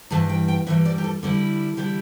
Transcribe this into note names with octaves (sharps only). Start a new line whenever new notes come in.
G2 E3 G3 A5
G5
G5
G2 E3 G3 E5
D5
G4
A4
D3 G3 E4 A4
D3 G3 E4 G4